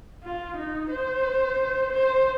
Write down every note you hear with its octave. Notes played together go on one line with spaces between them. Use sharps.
F4
D#4
C5
C5